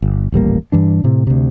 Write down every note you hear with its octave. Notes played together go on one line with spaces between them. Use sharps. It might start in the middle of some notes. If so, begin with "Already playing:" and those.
G1
D#1 A1 G3 A#3
G2 E3 D4
A2 C3
D2 C3